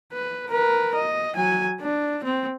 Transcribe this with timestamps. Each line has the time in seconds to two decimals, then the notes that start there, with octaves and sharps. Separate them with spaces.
0.13 B4
0.50 A#4 B4
0.96 D#5
1.36 F#3 G#5
1.81 D4
2.24 C4